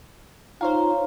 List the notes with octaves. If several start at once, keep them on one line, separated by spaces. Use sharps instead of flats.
D#4 F4 C5 C#5 F5 A#5